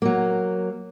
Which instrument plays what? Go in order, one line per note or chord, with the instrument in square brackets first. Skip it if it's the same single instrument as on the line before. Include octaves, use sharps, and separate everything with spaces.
[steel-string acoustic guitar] F#3 A#3